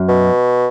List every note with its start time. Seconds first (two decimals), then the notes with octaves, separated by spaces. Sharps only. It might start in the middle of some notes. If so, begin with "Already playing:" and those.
Already playing: F#2
0.08 B2